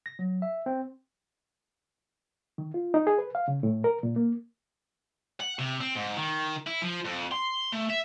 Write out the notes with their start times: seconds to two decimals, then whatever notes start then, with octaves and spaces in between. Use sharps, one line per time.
0.06 A#6
0.19 F#3
0.42 E5
0.66 C4
2.58 D#3
2.74 F4
2.94 D#4
3.07 G#4
3.18 B4
3.35 F5
3.48 C#3
3.63 A2
3.84 A#4
4.03 A#2
4.16 A#3
5.40 F#5
5.59 C3
5.80 C4
5.95 G#2
6.17 D#3
6.67 E4
6.82 F3
7.05 F2
7.31 C6
7.73 A3
7.90 E5